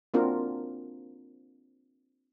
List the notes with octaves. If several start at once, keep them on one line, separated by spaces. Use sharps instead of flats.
A#3 C4 D4 F4 F#4 A#4